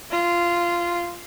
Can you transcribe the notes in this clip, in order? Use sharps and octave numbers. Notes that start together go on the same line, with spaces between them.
F4